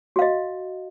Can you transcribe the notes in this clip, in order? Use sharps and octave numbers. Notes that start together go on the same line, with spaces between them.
F#4 D#5 F5